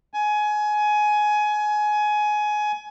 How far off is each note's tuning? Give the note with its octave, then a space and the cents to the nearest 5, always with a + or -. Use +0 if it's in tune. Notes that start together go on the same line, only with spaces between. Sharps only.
G#5 +20